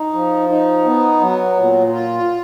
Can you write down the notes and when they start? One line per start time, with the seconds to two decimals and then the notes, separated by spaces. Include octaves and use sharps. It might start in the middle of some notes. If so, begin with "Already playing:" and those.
Already playing: D#4
0.13 F3
0.49 D#4
0.85 B3
1.21 F#3
1.57 A#2
1.92 F4